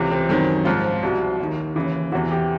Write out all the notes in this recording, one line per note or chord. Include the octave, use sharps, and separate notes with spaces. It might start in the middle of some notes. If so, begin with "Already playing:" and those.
Already playing: C#2 C3 E3
C4
F#2 D#3 C4
G#2 F3 F4
C2 B2
D#2 D#3
D#2 C#3 E3
E2 C3 E3 F#4
G4